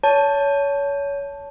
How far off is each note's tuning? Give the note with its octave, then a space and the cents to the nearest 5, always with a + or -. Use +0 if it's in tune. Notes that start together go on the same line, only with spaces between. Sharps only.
C#5 +25 A5 +0